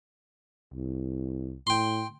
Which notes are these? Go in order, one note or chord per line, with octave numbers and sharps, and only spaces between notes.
C2
A2 G5 C6